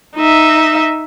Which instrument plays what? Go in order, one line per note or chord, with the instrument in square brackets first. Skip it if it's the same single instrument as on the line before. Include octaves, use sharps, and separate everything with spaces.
[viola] D#4 E5